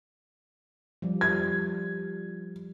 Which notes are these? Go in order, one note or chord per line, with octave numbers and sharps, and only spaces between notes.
F3 G3
G#6